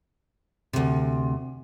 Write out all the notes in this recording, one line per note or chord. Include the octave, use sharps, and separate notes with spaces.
D2 C3